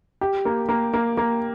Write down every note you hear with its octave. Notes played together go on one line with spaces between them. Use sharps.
G4
A#3
A#3
A#3
A#3